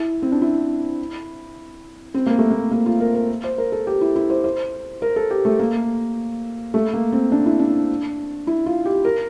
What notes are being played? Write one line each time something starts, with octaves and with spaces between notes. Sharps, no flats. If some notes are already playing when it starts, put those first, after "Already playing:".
Already playing: E4
C4
D4
E4
C4
A#3
A3
A#3
A#3
F4
A#4
A#4
C5
A#4
A4
G4
E4
E4
C5
C5
A#4
A4
G4
A3
A#3
A3
A#3
C4
D4
E4
D4
E4
F4
G4
A#4